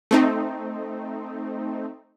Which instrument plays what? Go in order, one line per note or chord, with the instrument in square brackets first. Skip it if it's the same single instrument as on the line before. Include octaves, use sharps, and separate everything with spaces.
[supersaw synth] A3 C4 D#4